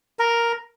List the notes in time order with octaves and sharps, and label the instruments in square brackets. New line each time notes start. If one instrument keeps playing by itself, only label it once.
[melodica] A#4